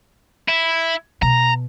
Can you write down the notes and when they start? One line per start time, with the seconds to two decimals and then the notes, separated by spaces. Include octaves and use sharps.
0.48 E4
1.22 B2 A#5